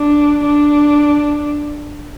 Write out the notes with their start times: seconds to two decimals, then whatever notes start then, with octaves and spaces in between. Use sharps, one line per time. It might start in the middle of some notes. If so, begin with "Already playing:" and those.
Already playing: D4
0.45 D4